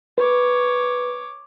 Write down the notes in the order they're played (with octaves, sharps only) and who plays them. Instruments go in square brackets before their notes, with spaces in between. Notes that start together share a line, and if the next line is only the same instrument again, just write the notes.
[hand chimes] B4 [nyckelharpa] C#5 D6